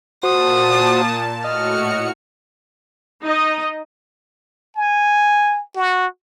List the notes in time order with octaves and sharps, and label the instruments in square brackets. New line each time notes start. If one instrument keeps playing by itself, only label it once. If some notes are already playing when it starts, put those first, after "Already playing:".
[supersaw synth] A#2 A5 [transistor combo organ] F#4 C5 [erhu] D#6
[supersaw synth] A2 F#4 C#7 [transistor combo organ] D#5 [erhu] F6
[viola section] D#4 D#5
[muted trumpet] G#5
F#4